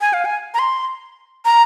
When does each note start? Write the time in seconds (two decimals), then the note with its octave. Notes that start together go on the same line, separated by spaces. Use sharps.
0.01 G#5
0.13 F5
0.25 G#5
0.54 A#5
0.59 C6
1.45 A#5